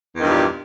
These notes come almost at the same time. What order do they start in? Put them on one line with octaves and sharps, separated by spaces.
E2 D#3 G2 A#2 G3